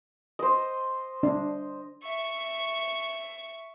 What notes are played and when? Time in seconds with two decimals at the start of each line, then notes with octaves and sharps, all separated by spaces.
0.39 C5 D#5
1.23 D4
2.04 E5 C#6